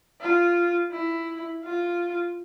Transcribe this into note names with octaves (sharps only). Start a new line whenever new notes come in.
F4
E4
F4